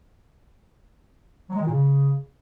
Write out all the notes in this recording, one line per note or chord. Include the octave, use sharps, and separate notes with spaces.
F#3
G#3
D#3
A#2
C#3